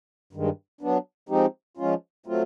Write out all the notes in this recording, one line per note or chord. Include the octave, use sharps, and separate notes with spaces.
G2 D#3 G#3
F#3 B3 D4
F3 G#3 C4 D#4 G4
F3 G#3 C#4 F4
F#3 A3 C4 F4